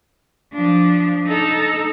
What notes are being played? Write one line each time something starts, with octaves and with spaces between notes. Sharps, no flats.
F3 D4
D#4 A4